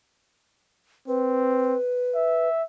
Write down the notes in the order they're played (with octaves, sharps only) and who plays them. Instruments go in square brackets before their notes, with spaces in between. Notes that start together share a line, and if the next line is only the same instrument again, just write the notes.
[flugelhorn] C4 [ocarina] B4
[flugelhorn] E5